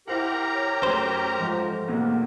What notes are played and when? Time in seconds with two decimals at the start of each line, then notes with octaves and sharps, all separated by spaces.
0.08 E4 G4 A#4 C5 F#5 A#5
0.54 C#5
0.83 F#2 A3 C5
1.38 G#2 F3 C4
1.88 B1 E2 A#3